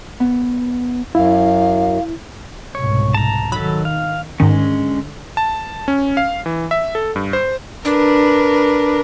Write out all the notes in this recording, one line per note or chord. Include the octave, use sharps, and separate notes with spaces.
B3
F#2 E4 F5
C2 G#2 B2 C#5
A5 A#5
D#3 F#3 A4 B5
F5
G#2 D3 D#3 G#3 C#4
A5
C#4
F5
E3
E5
A4
G2
C5
D4 A#4 B4